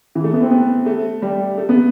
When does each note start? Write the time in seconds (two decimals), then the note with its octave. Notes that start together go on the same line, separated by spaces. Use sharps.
0.15 E3
0.24 A3
0.33 B3
0.42 C4
0.51 B3
0.86 A3
1.22 G3
1.58 A3
1.69 B3